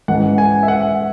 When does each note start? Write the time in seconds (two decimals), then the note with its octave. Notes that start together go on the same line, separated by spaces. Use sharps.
0.08 G#2 E3 G#3 C#4 F#5
0.38 G#5
0.63 E5
0.68 F#5